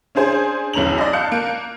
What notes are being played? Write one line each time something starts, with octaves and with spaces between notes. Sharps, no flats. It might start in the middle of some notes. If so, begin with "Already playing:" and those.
C#4 D4 G#4 C5 G#5
B1 E2 C#4 A#5 F7 F#7
D5 D#5
F5 A5 F#6 G6 C#7
A#3